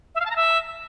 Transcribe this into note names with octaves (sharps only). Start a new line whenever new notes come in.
E5
F5
A5
A#5
E5